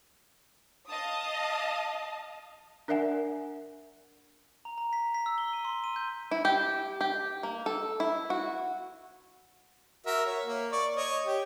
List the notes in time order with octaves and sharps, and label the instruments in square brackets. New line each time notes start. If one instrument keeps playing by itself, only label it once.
[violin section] D#5 F5 A5 D#6
[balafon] D4 A#4 D5 E5 F#5 G#5
[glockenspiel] A#5
A#5
B6
B6
E6
G7
D#7
C6
D#7
G6
[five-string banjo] E4
G4
G4
A#3
A4
E4
F#4
[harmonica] F#4 A#4 E5
C#5
A#3
D5 C#6
C#5 D#5
G4